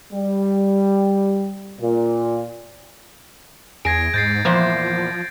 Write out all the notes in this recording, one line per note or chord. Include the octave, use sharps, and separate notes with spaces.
G3
A#2
E2 G#4 G#6 A#6 D7
G#2 G6 A6 C7
E2 A#2 F3 C5